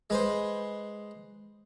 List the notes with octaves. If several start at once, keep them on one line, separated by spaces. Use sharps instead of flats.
G#3 B4 C5